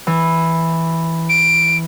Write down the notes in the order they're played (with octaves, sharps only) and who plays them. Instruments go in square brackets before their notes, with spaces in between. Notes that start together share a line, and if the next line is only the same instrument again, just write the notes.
[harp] E3
[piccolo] D7